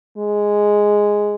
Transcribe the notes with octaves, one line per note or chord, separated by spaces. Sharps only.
G#3